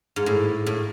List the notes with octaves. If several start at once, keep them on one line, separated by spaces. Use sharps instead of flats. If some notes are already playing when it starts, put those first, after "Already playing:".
G#2
A2
A2